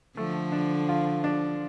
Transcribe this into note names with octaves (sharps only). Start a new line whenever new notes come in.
D3 F3 A3
D4
F4
D4